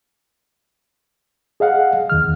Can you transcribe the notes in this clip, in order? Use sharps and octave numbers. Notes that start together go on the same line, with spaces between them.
G#4 D#5 F5 F#5
E2 D#3 F6